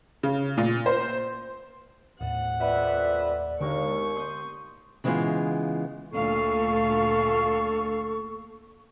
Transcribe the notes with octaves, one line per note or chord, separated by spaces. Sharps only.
C#3
A#2
C5
D#2 A2 F#5
F2 B4 D5 E5
D#2 D3 G#3 F5 C#6
C6 D#6 G6
C#3 E3 G#3 B3 F4
D2 A#2 A4 F5 C#6